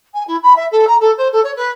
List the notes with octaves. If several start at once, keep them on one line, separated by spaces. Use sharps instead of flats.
G#5
E4
B5
E5
A4
A#5
A4
C5
A4
C#5
B4